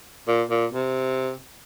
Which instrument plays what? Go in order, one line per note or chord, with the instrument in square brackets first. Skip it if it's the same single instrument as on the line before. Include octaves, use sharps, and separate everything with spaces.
[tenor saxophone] A#2
A#2
C3